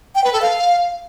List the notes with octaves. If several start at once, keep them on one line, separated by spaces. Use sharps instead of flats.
G5
B4
A4
F5